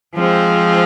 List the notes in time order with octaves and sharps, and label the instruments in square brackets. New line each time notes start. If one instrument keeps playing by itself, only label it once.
[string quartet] F3 G#3 C4 F4